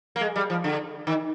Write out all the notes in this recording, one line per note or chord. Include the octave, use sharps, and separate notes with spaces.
A#3
G#3
G3
F3
D3
D#3